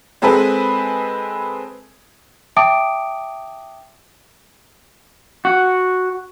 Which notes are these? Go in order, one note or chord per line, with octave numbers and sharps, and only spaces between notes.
G#3 C4 G#4 A4 B4
E5 G5 A5 D6 D#6 D7
F#4